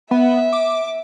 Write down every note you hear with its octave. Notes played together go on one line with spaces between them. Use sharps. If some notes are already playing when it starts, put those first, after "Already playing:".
B3 E5
D6